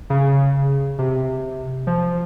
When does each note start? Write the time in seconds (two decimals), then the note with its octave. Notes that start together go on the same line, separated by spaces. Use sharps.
0.10 C#3
0.99 C3
1.87 F3